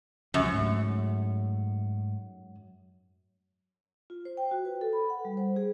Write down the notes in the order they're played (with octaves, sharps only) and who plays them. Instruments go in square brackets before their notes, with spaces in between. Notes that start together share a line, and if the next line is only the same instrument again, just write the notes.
[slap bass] C#2 C3 F3 [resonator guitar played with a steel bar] F#2
[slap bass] G#2 A3
[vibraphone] F4
C5
G5
F#4
B4
A4
B5
F#5
G3
C5
G#4